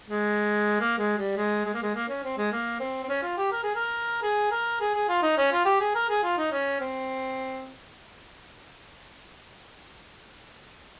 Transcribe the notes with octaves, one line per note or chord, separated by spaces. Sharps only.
G#3
A#3
G#3
G3
G#3
G#3
A#3
G#3
A#3
C#4
C4
G#3
A#3
C4
C4
C#4
F4
G4
A#4
G#4
A#4
G#4
A#4
G#4
G#4
F4
D#4
C#4
F4
G4
G#4
A#4
G#4
F4
D#4
C#4
C4